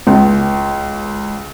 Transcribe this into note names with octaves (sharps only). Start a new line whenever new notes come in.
C#2